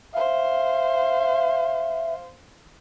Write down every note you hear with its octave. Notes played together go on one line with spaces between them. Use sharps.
C5 E5 F5